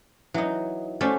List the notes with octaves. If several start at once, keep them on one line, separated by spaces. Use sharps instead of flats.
E3 F#3 D#4
A3 C#4 F#4 C5 D5 F#5